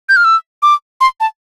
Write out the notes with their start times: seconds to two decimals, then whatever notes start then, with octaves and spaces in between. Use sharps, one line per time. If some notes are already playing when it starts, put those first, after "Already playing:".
0.09 G6
0.16 F6
0.25 E6
0.63 D6
1.01 C6
1.20 A5